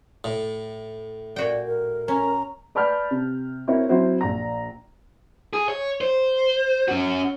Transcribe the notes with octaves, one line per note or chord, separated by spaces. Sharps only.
A2
A#2 F#4 D5 G5
A#4
C#4 A#5
B4 D5 A5 B5 F6 G6
C3
C4 E4 F#4 A#4 C#5
F#3 C4 E4 F#4 C5
A#1 A#5
G#4
C#5
C5
C#4 F#4